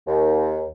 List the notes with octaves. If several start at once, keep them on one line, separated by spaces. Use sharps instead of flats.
D#2